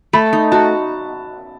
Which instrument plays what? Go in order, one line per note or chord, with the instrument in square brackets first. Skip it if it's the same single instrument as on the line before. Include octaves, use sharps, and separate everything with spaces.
[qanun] A3 [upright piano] B5
[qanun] D#4
[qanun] F#4 [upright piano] A5